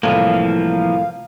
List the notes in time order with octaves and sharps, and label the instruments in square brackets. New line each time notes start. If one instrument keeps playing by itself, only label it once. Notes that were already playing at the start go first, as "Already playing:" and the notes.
[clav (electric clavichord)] C2 A2 [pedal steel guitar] E3 F3 A#3 [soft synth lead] F5